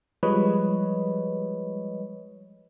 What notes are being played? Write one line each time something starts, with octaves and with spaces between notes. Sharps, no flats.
F3 G3 G#3 B4 C#5 D#5